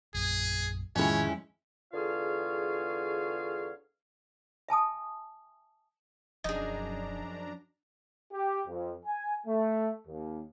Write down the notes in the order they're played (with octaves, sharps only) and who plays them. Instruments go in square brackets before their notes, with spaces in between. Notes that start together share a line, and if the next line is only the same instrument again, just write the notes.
[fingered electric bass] A#1 F#2 [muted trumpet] G#4
[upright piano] F2 G#3 [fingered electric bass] A2 D#3 [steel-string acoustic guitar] C#4 E4 [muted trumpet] C#5
[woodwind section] E2 D3 F4 G#4 C#5 F5
[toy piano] E5 G#5 A5 D#6
[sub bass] E1 [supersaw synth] F#2 D4 A#5 [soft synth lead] F3 [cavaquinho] D#4 G#4
[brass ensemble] G4
F2
G#5
A3
D#2